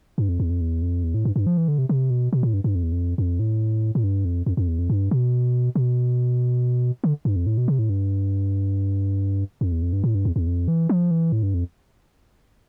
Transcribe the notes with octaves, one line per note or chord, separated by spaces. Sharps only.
G2
F2
E2
F2
E2
F2
E2
A2
G2
G2
F3
E3
D3
C3
C3
B2
B2
A2
G2
G2
F2
E2
F2
F2
A2
A2
G2
F2
F2
F2
E2
F2
G2
B2
B2
D3
G2
F2
A2
B2
C3
A2
G2
F2
E2
F2
G2
A2
G2
E2
E2
F2
E3
F3
E3
A2
G2
F2